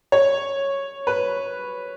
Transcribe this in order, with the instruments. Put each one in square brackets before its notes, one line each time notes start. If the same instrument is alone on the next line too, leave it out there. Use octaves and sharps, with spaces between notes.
[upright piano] C#5
B4